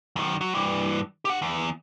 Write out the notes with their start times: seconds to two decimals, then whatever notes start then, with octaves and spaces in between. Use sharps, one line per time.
0.16 F#2 D#3
0.41 F#3
0.55 G2 E3
1.25 G4 F#5
1.42 E2